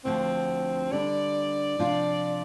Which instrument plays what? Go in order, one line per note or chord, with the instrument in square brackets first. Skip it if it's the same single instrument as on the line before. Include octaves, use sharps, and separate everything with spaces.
[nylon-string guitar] D2 D3 F3 [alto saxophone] C4
[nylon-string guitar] D3 G3 D4 [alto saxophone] D5
[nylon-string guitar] C3 F3 D4 F4